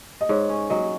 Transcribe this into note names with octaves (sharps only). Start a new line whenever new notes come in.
D#5
G#2 C#5
C#4
F#3 D#5